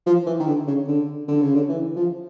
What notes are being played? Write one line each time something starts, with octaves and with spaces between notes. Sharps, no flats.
F3
E3
D#3
D3
C#3
D3
D3
C#3
D3
E3
F3